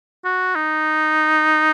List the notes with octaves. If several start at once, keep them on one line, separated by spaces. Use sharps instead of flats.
F#4
D#4